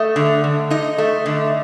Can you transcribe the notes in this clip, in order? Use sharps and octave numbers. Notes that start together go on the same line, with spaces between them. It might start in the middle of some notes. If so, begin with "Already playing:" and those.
Already playing: A3 D#5
D3
D3
D#4 D#5
A3
D3